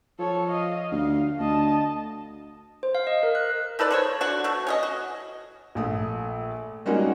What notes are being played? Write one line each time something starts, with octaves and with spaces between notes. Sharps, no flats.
F3 A4 C#5
D#5 F5
D2 F5
D2 D#5 A5
C5
F5
D#5
A#4
F#6
D#4 A4 B4 D5
A4 C5 C#5
D4 F#4
B2 A3
C#4 G#4 D#5
F#4
A#1 A3 D#6
G3 G#3 A#3 C#4 D#4 F#4